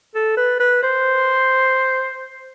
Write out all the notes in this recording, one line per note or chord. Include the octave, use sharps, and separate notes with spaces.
A4
B4
B4
C5